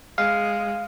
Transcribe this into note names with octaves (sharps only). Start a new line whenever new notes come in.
G#3 F5